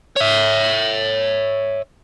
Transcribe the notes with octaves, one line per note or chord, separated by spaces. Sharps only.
C#5 E5